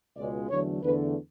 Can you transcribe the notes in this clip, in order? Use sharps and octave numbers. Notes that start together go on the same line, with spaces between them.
C#2 B2 G#3 D5
E2 D3 F#3 A3 C#5
E2 D3 A3 B4